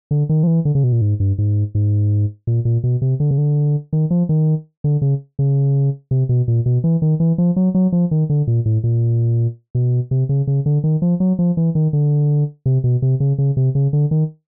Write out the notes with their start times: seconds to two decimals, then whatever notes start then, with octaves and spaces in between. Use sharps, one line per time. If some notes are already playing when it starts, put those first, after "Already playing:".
0.11 D3
0.29 D#3
0.43 F3
0.47 E3
0.65 D3
0.75 C#3
0.84 B2
0.92 A#2
1.01 G#2
1.20 G2
1.38 G#2
1.75 G#2
2.47 A#2
2.65 A#2
2.84 B2
3.02 C3
3.20 D3
3.31 C#3
3.38 D3
3.93 D#3
4.11 F3
4.29 D#3
4.84 D3
5.02 C#3
5.39 C#3
6.11 C3
6.29 B2
6.48 A#2
6.66 B2
6.84 E3
7.02 D#3
7.20 E3
7.38 F3
7.56 F#3
7.75 F#3
7.92 F3
8.11 D#3
8.30 D3
8.47 A#2
8.66 A2
8.84 A#2
9.75 B2
10.11 C3
10.29 C#3
10.47 C#3
10.66 D3
10.84 D#3
11.02 F3
11.20 F#3
11.39 F3
11.57 E3
11.75 D#3
11.93 D3
12.66 C3
12.84 B2
13.02 C3
13.20 C#3
13.38 C#3
13.57 C3
13.75 C#3
13.93 D3
14.11 D#3